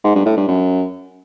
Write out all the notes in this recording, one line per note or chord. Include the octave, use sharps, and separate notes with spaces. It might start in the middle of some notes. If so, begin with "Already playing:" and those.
G#2
G2
A2
G2
F#2